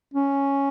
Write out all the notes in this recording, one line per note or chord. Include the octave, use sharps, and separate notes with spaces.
C#4